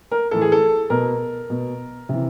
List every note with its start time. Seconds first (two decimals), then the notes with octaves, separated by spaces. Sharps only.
0.11 A#4
0.31 A2 E3 A4
0.41 G#4
0.52 A4
0.90 B2 A#4
1.50 B2
2.09 C3 E3